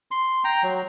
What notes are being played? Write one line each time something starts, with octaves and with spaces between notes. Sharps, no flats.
C6
G5 A#5
F#3